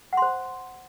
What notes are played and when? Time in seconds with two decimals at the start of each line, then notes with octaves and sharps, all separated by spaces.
0.13 F#5
0.17 C6
0.22 C5